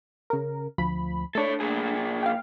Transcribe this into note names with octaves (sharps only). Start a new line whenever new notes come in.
C#3 A#4
D2 F3 B5
A3 D4 A4 C#5
A#2 G#4
F5 G5